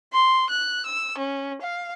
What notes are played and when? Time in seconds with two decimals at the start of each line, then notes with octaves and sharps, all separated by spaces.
0.13 C6
0.50 F#6
0.86 E6
1.18 C#4
1.62 F5